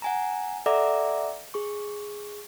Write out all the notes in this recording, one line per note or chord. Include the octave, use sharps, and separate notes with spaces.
F#5 G#5 A#5
A4 D5 E5 F#5 A#5 D6
G#4 C#6